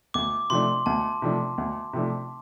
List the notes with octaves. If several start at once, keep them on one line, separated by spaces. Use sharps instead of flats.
D2 D6
C3 F3 A3 D4 C6
D2 A5
C3 F3 A3 D4
D2
C3 F3 A3 D4